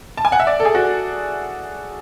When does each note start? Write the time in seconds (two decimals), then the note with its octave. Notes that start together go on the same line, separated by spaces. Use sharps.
0.17 A5
0.25 G#5
0.32 F#5
0.40 E5
0.47 D5
0.60 A4
0.65 G#4
0.75 F#4